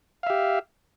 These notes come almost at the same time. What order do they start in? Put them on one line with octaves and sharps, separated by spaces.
F5 E5 G4